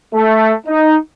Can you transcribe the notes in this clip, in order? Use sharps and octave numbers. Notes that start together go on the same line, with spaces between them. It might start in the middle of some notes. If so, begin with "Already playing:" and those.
A3
D#4